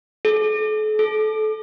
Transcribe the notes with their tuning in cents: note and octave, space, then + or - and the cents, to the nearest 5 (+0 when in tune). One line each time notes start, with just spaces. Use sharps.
A4 -40
A4 -25